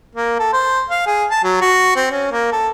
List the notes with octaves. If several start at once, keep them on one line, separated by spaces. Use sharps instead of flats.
A#3
A4
C5
F5
G#4
A5
F#3
F#4
C4
C#4
A#3
A4